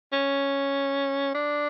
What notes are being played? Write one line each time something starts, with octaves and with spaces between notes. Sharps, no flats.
C#4
D4